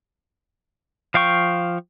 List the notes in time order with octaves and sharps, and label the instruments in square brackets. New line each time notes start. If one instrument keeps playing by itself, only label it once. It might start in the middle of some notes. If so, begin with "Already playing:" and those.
[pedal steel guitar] F3 F5 G5 C#6